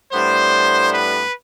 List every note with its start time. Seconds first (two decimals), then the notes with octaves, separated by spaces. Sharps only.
0.12 A2 G3 B3 D4 C5
0.91 B4